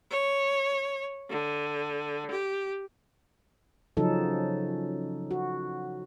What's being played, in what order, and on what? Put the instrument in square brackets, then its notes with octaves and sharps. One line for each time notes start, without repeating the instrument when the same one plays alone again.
[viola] C#5
D3
G4
[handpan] C#3 F3 F#3 C#4 D#4 A4
F#4